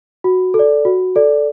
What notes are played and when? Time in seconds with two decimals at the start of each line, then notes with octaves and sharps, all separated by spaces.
0.24 F#4
0.54 A4
0.59 D5
0.85 F#4
1.16 A4 D5